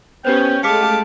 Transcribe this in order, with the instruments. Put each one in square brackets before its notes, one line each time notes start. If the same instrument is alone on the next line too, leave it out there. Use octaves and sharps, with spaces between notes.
[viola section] B3 C#4 [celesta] G4 B4 C5 [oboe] G5
[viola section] G#3 A3 [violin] G4 A5 [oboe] F5 [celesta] D6 B6 C#7